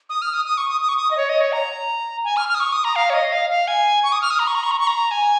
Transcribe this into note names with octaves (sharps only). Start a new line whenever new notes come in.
D#6
F6
D#6
D#6
C#6
D#6
D#6
C#6
D#6
D#5
C#5
D#5
C#5
A#5
G#5
F6
F6
D#6
C#6
D#6
A#5
F5
C#5
D#5
F5
F5
G#5
C#6
D#6
F6
D#6
A#5
C#6
A#5
C#6
A#5
C#6
A#5
G#5